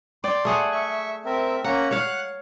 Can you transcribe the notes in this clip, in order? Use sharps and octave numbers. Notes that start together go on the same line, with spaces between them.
D5 G5 C6
A3 G#4 F#5
E5 C#6
C4 A#4 E5
A#3 C#4 F#5 A#5
C#5 F5 F#5 F#6